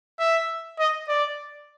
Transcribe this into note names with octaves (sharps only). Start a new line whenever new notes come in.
E5
D#5
D5